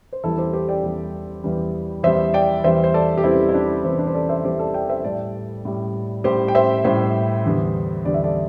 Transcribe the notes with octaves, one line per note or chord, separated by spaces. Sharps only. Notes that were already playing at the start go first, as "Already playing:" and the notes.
C5
E2 E3 G3 E4 A4
G4 C5
G4 C5
D5 G5
E2 E3 G3
E2 E3 G3
E2 E3 G3 C5 E5
D5 G5
E2 E3 G3 C5 E5
C5
A4 D5
G4
E2 E3 G3 C4 E4
E4
D4
E2 E3 G3 C4
D4
C5
A4 D5
C5 E5
E2 E3 G3 G4 C5
A4 D5
D5 G5
C5 E5
A2 G3 A4 D5
A2 G3
A2 G3 G4 C5
G5
C5 E5
A2 G3 C5 E5
E2 D3 G3
E2 D3 G3 D5
E5
A4 D5